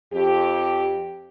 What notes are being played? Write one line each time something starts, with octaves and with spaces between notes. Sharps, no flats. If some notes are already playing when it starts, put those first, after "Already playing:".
F2 G4